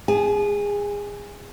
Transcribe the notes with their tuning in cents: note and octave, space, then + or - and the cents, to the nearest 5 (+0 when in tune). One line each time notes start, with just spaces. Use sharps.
G#4 -25 G#5 +40